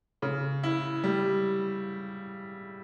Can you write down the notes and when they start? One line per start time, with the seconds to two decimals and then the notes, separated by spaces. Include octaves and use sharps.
0.22 C#3
0.63 E4
1.04 G3